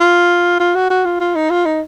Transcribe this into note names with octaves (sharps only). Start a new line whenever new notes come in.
F4
F4
F#4
F#4
F4
F4
D#4
F4
D#4